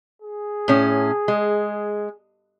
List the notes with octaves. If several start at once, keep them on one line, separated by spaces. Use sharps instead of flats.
G#4
A2 C#4
G#3